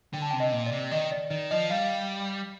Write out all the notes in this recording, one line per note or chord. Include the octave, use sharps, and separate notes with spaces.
D3 G5
A5
C3 G5
D#5
A#2
D5
C3
D#3 D#5
D5
D#3 D5
F3 D#5
G3 F5